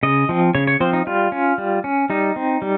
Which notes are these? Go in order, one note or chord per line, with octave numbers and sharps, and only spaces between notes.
C#3 D#5
F3 C4
C#3 C#5
C#5
F3 C4 C5
D#4
G3 F4
C#4
G3
C#4
G3 D#4
C4
G3